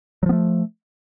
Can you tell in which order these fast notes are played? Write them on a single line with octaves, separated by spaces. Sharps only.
F#3 F3 B3 A3